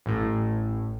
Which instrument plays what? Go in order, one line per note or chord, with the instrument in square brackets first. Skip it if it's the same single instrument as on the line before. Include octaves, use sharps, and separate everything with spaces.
[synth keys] A1 A2